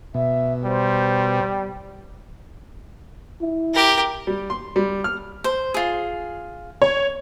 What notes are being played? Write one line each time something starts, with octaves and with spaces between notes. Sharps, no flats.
B2 E5
G3 C5
E4
G4 A#4
G3
C6
G3
F6
C5
F4 G#4
C#5